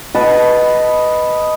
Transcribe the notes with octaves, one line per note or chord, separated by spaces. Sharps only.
B4 D#5 A5